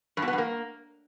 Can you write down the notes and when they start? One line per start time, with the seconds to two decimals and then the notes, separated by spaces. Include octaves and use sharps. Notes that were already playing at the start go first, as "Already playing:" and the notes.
0.17 G2
0.22 B2
0.28 B3
0.33 G2
0.38 A#3